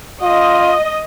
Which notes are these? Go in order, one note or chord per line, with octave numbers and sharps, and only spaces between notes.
F4 D#5